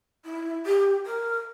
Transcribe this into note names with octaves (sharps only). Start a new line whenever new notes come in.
E4
G4
A#4